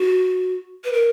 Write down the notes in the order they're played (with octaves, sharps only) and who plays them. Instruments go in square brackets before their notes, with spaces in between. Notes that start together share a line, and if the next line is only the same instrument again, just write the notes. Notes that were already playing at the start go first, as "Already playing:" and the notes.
Already playing: [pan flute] F#4
B4
A#4